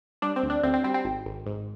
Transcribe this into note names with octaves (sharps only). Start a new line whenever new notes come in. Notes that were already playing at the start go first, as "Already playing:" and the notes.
G3 D4
C4
D2
D4
D2 C4
C4
G3 C4
C4
G#1
G#1
G#2